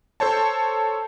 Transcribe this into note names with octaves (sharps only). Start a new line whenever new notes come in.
A4 C5 C#5 A5